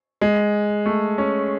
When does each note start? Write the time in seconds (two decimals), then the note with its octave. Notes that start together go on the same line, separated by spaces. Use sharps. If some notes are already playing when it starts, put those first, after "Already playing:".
0.21 G#3
0.86 A3
1.18 C#4